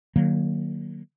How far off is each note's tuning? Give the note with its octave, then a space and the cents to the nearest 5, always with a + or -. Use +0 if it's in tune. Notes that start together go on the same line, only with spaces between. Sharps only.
D#3 -35 F#3 +0 A#3 +0